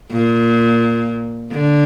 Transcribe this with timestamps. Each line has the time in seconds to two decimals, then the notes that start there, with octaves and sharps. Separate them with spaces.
0.11 A#2
1.52 D3